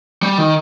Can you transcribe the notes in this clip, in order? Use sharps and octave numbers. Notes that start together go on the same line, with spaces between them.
G3
D#3